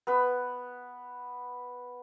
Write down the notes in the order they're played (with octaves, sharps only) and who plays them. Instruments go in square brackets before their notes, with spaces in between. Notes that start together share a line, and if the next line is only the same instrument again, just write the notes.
[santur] B3 B4